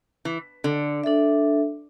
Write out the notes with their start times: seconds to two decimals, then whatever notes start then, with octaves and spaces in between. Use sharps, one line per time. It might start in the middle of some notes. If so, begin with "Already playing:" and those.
0.25 E3
0.64 D3
1.04 D4 A4 E5